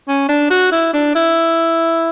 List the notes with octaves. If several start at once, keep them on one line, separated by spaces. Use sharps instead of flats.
C#4
D4
F#4
E4
D4
E4